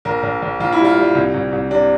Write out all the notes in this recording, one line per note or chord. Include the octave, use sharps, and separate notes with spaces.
A#1 A#4
A#1
A#1
A#1 F4
E4
G3
F4
G3
C2
C2
C2
C3 D4